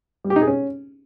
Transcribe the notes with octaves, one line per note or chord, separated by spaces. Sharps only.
G3
G4
D#4
G#4
C#4